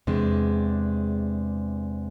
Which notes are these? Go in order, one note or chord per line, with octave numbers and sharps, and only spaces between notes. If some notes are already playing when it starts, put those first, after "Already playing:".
E2 C3 G#3 D4